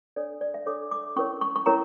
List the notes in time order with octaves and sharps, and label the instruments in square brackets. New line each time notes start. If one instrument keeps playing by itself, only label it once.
[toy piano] D4 A4 C#5 D5
D5
E5
D4 A4 C#5 D6
D6
C#4 E4 A#4 C#5 C#6
C#6
C#6
C#4 E4 A#4 C#5 A#5